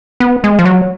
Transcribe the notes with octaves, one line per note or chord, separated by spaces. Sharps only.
B3
G#3
F3
F#3